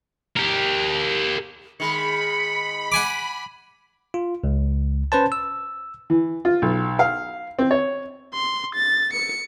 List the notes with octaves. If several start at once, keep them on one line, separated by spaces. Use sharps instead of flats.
G4 A#4
D#3 G#3 B5 C#7
F#5 G#5 D6
F4
C#2
C#4 B4 C5 A5
E6
E3
F4
B1
F5
C4
C#5
C6
A6
C#7